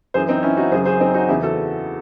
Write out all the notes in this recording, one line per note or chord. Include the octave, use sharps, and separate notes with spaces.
F#2 E3 G#4 C5
C4 D#4
C#4 E4
D#4 F#4
F#2 C#3 F#3 G#4 C5
G#4 C5
C4 D#4
D#4 F#4
E2 C#3 E3 E4 G#4
F#4 A4